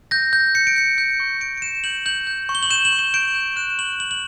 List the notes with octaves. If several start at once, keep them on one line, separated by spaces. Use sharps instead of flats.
G6 A#6
G6
G6 C#7
D7
G6 C#7
G6
C#6
G6 D7
D7
G6 E7
G6 F#7
G6 F#7
G6
C#6
G7
F#7
G6 E7
F#7
C#6
E7
G6 D7
G6
F#6 E7
C#6 F#7
F#6 F#7
F#7